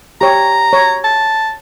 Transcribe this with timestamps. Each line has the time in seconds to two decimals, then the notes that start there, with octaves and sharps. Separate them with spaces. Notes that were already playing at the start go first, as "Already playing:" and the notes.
0.21 G4 C#5 A#5
0.73 C#5
1.04 A5